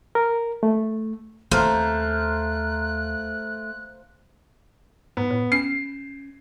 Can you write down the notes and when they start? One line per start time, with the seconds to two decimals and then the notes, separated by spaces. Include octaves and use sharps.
0.15 A#4
0.63 A3
1.51 D#2 A3 C4 C5 F5 A#5 F#6
5.17 G#2 B3
5.30 A2
5.52 C#4 C7